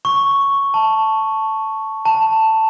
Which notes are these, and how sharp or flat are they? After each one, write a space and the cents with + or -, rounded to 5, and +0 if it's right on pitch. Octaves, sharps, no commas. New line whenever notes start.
C#6 +0
A5 +0
A5 +10